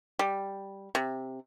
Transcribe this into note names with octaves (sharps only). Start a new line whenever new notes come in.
G3
C3